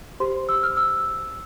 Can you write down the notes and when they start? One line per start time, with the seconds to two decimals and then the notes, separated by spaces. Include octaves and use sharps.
0.20 G4 C5 C6
0.49 E6
0.63 F6
0.77 E6